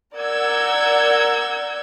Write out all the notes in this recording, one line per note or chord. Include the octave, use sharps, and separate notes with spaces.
A#4 D5 F#5 E6 G6 G#6